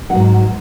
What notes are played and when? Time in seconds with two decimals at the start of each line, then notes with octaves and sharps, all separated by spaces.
0.10 D#4 F#5
0.13 G#2 F#3